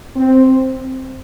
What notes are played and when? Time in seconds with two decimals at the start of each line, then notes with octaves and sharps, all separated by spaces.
0.16 C4